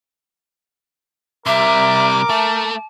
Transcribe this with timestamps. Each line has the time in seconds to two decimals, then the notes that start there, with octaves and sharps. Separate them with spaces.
1.46 C3 G3 A#4 E5 D6
2.30 A3 A5